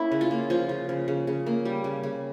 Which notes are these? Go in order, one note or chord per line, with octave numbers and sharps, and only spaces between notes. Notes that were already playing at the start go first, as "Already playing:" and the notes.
Already playing: A#3 C#4 E4
C#3
F4
A#3
F3 F4
C#3
C#3
C#3
C#3
A#3
G3
C#3
C#3